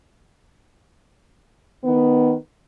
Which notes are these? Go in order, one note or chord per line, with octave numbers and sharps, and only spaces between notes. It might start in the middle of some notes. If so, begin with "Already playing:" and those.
D#3 B3